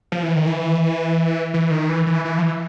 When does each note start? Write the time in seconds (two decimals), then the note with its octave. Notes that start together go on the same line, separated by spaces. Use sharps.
0.12 F3
0.23 E3
0.36 D#3
0.47 E3
1.54 E3
1.71 D#3
1.89 E3
2.06 E3
2.25 E3
2.38 F3
2.42 E3